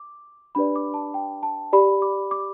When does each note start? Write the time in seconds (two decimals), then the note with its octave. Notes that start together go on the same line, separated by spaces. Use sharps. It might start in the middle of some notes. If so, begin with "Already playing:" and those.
Already playing: D6
0.55 D4 G4 B4 D5 B5
0.76 D6
0.94 A5
1.14 G5
1.43 A5
1.73 G4 D5 B5
2.02 D6
2.31 D6